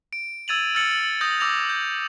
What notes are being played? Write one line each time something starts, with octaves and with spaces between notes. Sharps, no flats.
D7
E6 G#6 A6 D#7 F7 F#7
E6 F6 A6 C#7 F#7
D#6 G6 A#6
D6 E6 G6 A#6 F7
G6